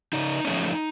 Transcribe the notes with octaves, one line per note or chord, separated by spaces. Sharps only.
C#3 D#4
F3 A3 C#4